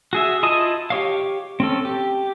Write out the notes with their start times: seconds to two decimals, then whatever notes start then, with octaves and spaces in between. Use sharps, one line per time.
0.13 F#4 G#4 E5
0.43 E4 F4 D#5 A5 D#6
0.90 G4 C#5 F5
1.60 C4 C#4 A4
1.85 G4